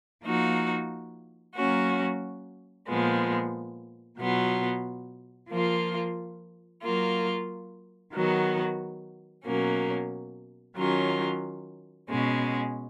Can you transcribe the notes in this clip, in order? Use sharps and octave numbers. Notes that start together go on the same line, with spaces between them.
F3 A#3 D#4 F#4
F#3 A#3 C#4 F#4
A#2 F3 G#3 B3
B2 F#3 B3 F4
F3 A#3 F4
F#3 A#3 F4
D#3 F#3 B3 F#4
B2 F#3 A#3 C#4
D#3 F#3 C#4 F4
B2 G#3 C#4